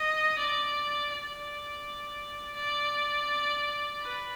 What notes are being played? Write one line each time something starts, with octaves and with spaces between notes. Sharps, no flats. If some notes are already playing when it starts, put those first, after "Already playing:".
Already playing: D#5
D5
D5
D5
B4